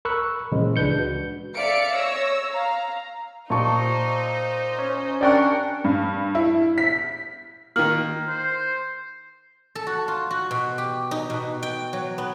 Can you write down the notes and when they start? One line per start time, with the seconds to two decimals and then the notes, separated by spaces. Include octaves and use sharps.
0.05 A#4 B5 C#6 E6 F#6
0.52 A#2 C#3 E3 F3 G#3
0.76 C#2 D4 B4 G6 C#7
0.99 F#4
1.55 D5 E5 F5 C#7 D7
1.96 C#5 E6 A#6
2.52 F5 A#5
3.50 A#2 D#4 C5 A5 C#6
4.78 C#4
5.21 C#4 D4 A#4 D5 F#5 G5 C#6
5.84 G2
6.35 E4
6.78 B6
7.76 D#3 A#3 F6 F#7
8.28 C5
9.75 A4
9.87 F#4
10.08 F4
10.31 F#4
10.51 B2
10.78 G4
11.11 D#4
11.30 B2
11.63 G5
11.93 F#3
12.18 B3